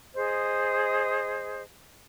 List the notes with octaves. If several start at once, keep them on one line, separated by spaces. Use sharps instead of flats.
G#4 C5 D#5